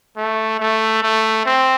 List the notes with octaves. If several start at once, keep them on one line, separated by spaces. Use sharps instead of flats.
A3
A3
A3
C4